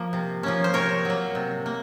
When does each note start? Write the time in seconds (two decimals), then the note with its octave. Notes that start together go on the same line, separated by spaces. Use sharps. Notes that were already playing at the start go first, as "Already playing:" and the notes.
Already playing: F3 A#3
0.13 C3
0.43 F3 A#3 C#4
0.64 C5
0.73 C3 A#4 C#5
1.05 F#3 A#3
1.35 C3
1.66 A#3